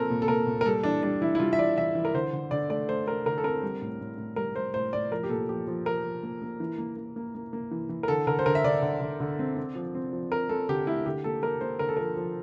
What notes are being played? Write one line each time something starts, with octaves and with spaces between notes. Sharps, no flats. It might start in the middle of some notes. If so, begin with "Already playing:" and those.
Already playing: A#2 F3 C4 A4 A#4
A#2
A4
A#2 A#4
A#2
A#4
G3 A4
E3 D4
G3 D4
E3 E4
E4
G3 F4
E5
E3 D5
E3 E5
E3
A#4
D3 C5
D3
D3 D5
A3 D5
A3 C5
A3 A#4
D3 A#4
A4
C4 A#4
G3
A2
A2
A2
G3 A#4
G3 C5
A2 C5
A2 D5
F3 A#4
G4
A#2 A4
F3 G4
F3
F3 A#4
F3
A#3
A#3
E3
A#3
A#3
A#3
A#3
A#3
E3
E3
A#4
D3 A4
D3 A#4
C5
D3 A#4
E5
D3 D5
D3
D3
D3
C4
C4
F3
C4
F3
C4 A#4
C4 A4
D3 G4
A3 E4
D3 G4
A#3 A4
A#3 A#4
A#3 C5
D3 A#4
A4
F3 A#4
F3